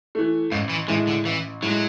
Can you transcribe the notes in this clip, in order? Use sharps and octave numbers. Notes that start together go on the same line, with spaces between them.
E3 A3
A1 G#2
E3
A2 E3 G#3
D3
A1 E3
A2 F#3 G#3